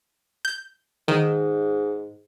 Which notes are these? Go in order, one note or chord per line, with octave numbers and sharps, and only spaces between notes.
G6
G#2 D#3